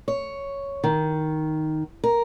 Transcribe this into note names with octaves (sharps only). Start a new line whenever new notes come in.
C#5
D#3
A#4